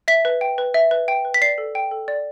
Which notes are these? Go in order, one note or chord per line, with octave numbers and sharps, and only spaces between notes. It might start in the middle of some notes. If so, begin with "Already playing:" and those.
E5 B6
B4
G5
B4
E5
B4
G5
B4
B6
D5 C7
A4
G5
A4
D5